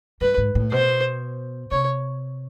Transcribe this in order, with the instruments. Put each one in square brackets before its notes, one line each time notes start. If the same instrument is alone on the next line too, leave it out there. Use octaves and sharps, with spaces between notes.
[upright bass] G2 [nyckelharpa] B4
[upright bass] G#2
A2
[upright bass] B2 [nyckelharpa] C5
[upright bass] C3 [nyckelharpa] C#5